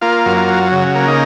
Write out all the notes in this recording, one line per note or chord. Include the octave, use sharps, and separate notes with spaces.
A#3 F4
F#2
F4
F#3
C#3
A#3
D#4